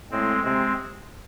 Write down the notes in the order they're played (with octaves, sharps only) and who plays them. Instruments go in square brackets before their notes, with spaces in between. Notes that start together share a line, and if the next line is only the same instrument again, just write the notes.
[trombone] A2 [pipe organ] G#3 C4
[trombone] C3 [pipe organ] G#3 C4